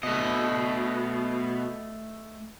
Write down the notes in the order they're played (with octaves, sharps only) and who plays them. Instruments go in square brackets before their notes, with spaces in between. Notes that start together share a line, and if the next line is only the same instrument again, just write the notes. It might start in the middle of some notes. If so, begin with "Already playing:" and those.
[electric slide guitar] B2 [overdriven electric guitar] A3 D#5